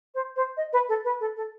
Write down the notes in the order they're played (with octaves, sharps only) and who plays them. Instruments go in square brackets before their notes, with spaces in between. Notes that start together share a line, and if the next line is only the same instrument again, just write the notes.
[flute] C5
C5
D#5
B4
A4
B4
A4
A4